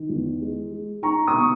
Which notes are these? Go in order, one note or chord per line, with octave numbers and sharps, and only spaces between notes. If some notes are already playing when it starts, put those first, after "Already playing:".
Already playing: D#3
E2
G#3
G#3
D#4 A#5 C#6
D#6
B2
C#6